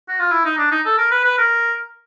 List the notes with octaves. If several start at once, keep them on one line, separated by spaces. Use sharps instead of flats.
F#4
F4
E4
D#4
D4
D#4
A4
A#4
B4
B4
A#4